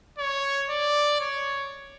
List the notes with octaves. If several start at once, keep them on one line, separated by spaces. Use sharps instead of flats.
C#5
D5
C#5